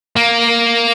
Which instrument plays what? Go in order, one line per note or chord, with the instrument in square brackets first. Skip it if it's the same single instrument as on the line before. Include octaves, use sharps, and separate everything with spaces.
[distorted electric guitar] A#3